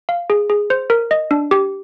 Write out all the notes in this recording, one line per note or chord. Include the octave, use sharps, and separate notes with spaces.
F5
G#4
G#4
C5
A#4
D#5
D4
G4